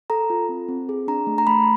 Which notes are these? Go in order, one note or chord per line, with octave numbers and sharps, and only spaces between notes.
A4 A#5
F4
C4
C4
G#4
D4 A#5
A3
A#5
A3 B5